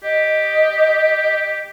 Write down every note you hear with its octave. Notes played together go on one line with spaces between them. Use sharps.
G4 D#5